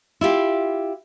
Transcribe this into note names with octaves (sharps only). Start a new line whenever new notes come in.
E4 F4 G4